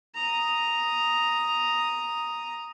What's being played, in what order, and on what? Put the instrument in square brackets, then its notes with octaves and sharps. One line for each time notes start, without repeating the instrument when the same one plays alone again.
[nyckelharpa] A#5 D#6